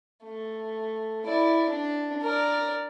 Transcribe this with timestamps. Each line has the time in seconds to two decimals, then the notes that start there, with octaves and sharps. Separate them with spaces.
0.25 A3
1.26 E4 D5
1.70 D4
2.22 A#4 D5